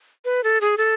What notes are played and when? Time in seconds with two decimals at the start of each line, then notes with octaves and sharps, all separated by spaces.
0.25 B4
0.44 A4
0.61 G#4
0.78 A4